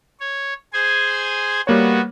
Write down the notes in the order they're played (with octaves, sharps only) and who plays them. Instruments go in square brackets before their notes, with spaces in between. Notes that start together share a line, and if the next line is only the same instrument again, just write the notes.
[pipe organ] C#5
G#4 C5 G#5
[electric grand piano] G3 A#3 C#5 [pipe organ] B3 F#4